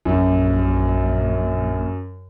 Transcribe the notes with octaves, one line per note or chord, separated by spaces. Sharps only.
A#1 F#2